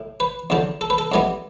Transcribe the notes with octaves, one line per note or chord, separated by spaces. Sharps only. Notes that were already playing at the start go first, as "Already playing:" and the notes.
Already playing: A2
B4
E2 D3 F3
A4
B4
A4
F2 E3 G3 B3